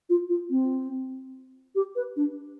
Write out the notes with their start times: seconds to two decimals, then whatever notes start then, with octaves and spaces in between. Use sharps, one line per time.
0.09 F4
0.29 F4
0.50 C4
1.75 G4
1.95 B4
2.16 D4